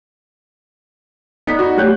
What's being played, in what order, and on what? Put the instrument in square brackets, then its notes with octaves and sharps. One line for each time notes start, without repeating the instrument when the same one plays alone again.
[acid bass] B3 [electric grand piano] D#4 [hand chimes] A4 D5 B6
[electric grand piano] D#4 F#4
[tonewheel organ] A3 G4 [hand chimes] F4 [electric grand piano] C#5 F#6 G6